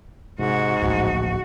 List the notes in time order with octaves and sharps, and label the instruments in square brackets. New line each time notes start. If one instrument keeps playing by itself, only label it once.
[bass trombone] G#2 [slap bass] C3 [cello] F#4
[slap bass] D1 A#1